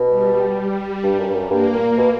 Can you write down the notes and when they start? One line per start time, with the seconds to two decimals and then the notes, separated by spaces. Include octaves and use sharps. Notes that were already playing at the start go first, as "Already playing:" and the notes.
Already playing: B2
0.09 G3
1.03 G2
1.19 F#2
1.29 G2
1.35 F#2
1.50 G2 A#3
1.74 A#2
1.98 B2